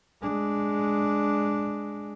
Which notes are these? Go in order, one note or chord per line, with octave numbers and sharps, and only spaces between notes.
G#3 D4